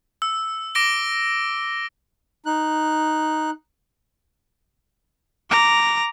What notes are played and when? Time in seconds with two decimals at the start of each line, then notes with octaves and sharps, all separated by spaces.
0.22 E6
0.75 D6 A#6 D7 G7
2.46 D#4 F#6
5.51 A#5 D6